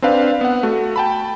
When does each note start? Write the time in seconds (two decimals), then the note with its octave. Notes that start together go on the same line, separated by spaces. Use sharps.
0.02 C4 D4 B4 F5
0.41 B3 F#5
0.63 A3 F#4
0.96 G5 A5 B5